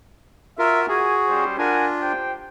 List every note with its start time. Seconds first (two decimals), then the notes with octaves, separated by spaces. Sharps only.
0.59 F4 F#4 A#4 E5
0.89 F#4 G#4 G#5
1.28 G3 C#4 C5
1.58 D4 F4 A#4 F#5 G#5
2.01 G4 C5 G5